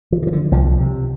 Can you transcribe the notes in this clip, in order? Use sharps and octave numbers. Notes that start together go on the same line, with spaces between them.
F3
D3
F3
D3
C2 F3
C3